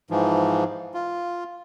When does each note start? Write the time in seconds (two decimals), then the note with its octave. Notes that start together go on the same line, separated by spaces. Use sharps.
0.10 G#2 E3 F3
0.94 F4